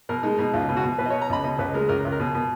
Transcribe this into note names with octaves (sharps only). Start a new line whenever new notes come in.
B2 A#4
G#3 D#4
B2 D#4
C#2 F4
B2
F#4
B2
B2 B4
D#5
C#5
B2
A#5
C#2 B5
B2 D#5
C#2 B4
G#3 A#4
C#2 A#4
C#2
A#4
B2
B2